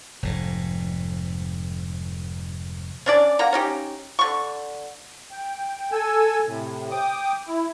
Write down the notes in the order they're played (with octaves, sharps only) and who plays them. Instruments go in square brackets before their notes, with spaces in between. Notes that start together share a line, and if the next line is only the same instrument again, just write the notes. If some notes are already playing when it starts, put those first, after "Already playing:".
[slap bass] F1 G#2
[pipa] C#4 D4 D5
A#3 F#5 A#5
C#4 D#4 G4
D3 C#6
[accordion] G5
A4 G#5 E6
A2 C3
G5 D6 D#6
E4